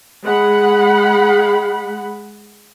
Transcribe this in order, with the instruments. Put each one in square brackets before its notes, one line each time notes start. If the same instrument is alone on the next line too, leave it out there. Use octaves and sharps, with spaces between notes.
[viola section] G#3 F#5 B5